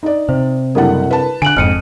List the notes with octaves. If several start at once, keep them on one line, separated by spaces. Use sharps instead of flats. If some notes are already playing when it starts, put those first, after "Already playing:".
D#4 D5
C3 C5
F#1 G3 E4 A4 A#4 F#5
B4 A5
D3 G#5 F#6 D7 F#7
F1 F2 G#2 F6 C#7 D#7